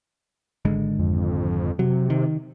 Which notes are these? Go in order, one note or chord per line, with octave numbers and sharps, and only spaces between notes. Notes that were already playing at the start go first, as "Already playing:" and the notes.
G#1 D3 G#3
F2
C3 F#3
D#3